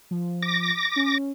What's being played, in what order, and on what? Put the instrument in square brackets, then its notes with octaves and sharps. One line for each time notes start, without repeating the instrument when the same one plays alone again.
[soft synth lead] F3
[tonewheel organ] D6 A#6
[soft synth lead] C#4